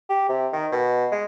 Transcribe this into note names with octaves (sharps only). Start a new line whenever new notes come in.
G4
C3
D#3
B2
G#3